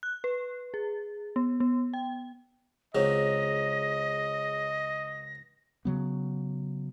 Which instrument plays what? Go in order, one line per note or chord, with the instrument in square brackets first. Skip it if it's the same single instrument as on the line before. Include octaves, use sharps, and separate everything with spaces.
[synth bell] F#6
B4
G#4
B3
B3
G5
[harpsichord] C#2 F#3 C4 [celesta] G#4 C#5 [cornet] D#5 [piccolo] A#6
[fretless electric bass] C#3 F#3 B3